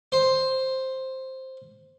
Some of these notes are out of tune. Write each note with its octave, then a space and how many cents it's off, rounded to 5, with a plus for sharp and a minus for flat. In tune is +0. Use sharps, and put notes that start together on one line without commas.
C5 +5